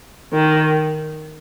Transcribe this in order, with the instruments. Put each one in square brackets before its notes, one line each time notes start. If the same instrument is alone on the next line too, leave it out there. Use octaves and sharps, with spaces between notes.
[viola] D#3